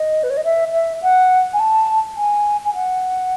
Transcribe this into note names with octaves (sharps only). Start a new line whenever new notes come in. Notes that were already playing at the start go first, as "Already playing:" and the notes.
Already playing: D#5
B4
C#5
D#5
E5
E5
F#5
G#5
A5
G#5
G#5
F#5